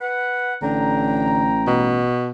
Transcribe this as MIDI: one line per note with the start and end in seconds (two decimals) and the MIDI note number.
0.01 0.55 71
0.01 0.55 78
0.62 2.09 33
0.62 1.52 50
0.62 1.88 79
0.62 1.88 82
1.67 2.31 47